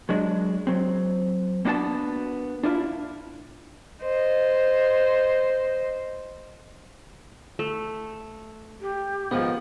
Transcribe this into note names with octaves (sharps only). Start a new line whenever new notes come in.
F#3 G#3 D4
F#3 C4
A#3 B3 D4 F#4 F5 A5
D4 E4 F4
C5 D#5
A3
G4
G#2 D#3 F3 B3